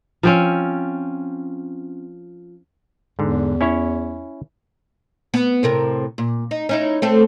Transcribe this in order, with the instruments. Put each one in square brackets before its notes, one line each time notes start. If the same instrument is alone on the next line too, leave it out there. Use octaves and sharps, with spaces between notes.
[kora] F3 C4 C#4
[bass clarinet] E2 [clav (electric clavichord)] G#2 D3
[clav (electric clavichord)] C#4 E4 C#5
[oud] B3
A2 C3 A#4
A#2
D#4
C#4 D#4 E4
A3 C4 A4